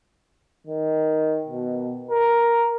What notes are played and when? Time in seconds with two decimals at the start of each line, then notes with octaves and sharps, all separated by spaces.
0.67 D#3
1.48 B2
2.11 A#4